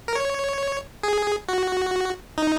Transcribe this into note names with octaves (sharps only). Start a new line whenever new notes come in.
A#4
C#5
G#4
F#4
D#4